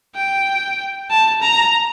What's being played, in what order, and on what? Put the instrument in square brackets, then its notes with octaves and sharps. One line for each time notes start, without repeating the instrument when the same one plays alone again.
[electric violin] G5
A5
A#5